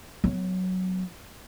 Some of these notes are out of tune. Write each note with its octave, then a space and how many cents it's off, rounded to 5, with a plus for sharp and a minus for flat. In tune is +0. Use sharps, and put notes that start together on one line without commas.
F#3 +0 B3 +30